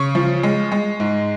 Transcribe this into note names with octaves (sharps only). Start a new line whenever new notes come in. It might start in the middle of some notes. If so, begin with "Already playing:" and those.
Already playing: C#3 C#6
F3
G#3
G#3
G#2